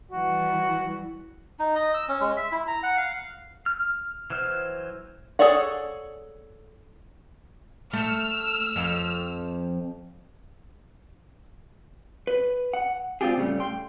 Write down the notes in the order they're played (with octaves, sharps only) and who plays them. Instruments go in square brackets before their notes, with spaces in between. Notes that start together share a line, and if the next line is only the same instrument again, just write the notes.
[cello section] E3 G3 [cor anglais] F#4
[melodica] D#4
D#5
E6
C#4
G#3
E5
E4
A#5
F#5
F5
[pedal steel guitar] F6
E3 F#3 C5 F6
[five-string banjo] G#4 A4 C#5 D5 F#5
[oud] A3 [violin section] E6 F6
[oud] F2
[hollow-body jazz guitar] B4
F#5
G#3 C4 D4 F4 G4 G#4
A2 C#3 F#3 G3 A3
G5 C6